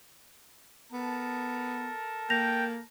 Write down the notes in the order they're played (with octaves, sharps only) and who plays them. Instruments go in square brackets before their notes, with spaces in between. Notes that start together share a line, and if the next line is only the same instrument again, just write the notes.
[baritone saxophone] B3 [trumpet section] A4 A#4 A5
[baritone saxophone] A#3 [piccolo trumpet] G5 [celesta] G6 A#6 F7